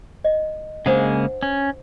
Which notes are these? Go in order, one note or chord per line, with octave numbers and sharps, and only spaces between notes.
D#5
C#3 G#3 A#3 D4 C5 F#5
C#4